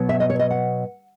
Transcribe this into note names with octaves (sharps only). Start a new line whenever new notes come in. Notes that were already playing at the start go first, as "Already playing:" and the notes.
Already playing: B2 F#3 B3
E5
D#5
C#5
D#5
F#5